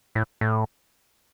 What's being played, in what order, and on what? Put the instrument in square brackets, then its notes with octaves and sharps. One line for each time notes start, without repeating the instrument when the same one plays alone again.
[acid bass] A2
A2